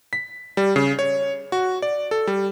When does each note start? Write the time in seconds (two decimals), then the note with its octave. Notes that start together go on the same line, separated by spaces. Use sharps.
0.13 B6
0.57 G3
0.76 C#3
0.99 C#5
1.52 F#4
1.82 D5
2.11 A4
2.27 G3